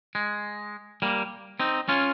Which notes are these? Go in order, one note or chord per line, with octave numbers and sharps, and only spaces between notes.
G#3
G3 A#3
C4 D#4
C#4 F4